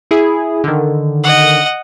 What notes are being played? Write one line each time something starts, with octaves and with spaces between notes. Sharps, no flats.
E4 G#4
D3 D#3
D#5 F#5